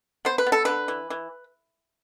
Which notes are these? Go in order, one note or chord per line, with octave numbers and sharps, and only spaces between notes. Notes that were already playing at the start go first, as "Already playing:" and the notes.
B3 C5
B4
B3
A4
D3 B4
E3
E3